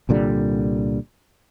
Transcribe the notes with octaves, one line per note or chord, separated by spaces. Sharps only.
C2 A#2 D3 G3